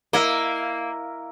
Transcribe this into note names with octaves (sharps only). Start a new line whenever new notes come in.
A#3 E4 D#5